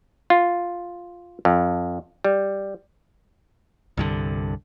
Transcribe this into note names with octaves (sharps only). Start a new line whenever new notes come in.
F4
F2
G3
C2 G2 D3